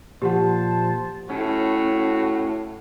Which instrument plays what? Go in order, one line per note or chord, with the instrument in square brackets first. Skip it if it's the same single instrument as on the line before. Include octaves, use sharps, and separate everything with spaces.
[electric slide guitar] A#2 F3 [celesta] G4 F#5 [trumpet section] C5 A5
[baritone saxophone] A2 [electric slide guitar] C#4 [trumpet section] F#4